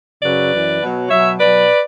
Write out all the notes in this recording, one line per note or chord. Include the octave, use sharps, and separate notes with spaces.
F#2 C#3 F#3 B4 D5
F#2 E3
B2 F#3
B2 F#3 C#5 E5
B2 F#3 B4 D5